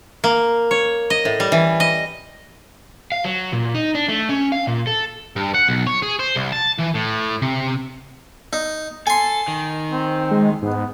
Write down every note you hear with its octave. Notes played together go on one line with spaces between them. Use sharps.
A#3
C#5
D#5
A2
G3
E3
D#5
F5
F#3
A#2
D#4
D4
A3
C#4
F5
A#2
A4
G2
F#5
B1
C#5
G#4
C5
C2
A5
E3
A2
C3
D#4
A4 G#5 C6
D#3
C4
G#3
G#2 B3